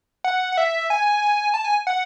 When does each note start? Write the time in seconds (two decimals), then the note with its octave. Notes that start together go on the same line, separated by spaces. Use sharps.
0.24 F#5
0.52 F#5
0.57 E5
0.90 G#5
1.54 A5
1.64 G#5
1.87 F#5